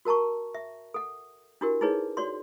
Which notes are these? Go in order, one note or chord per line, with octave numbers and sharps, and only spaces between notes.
F#4 A#4 A5 A#5 C#6
E5
A4 F#5
D4 E4 F#4 G4 A#4
D#4 E4 G#4 B4 C#5
F#4 C#5 D5 C6